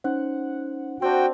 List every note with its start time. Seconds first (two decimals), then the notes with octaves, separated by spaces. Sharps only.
0.04 C#4 D#4 C5 F#5
1.02 C4 D4 F#4 G5